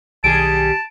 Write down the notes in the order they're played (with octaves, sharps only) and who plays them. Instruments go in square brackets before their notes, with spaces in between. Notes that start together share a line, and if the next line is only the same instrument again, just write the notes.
[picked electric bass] B1 D#3 [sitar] G3 G#4 [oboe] A5 [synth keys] D7